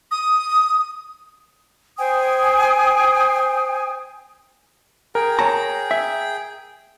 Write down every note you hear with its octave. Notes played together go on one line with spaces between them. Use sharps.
D#6
C5 G5 G#5 D#6
G#4 A#4 G5
C#5 A5 A#5
E5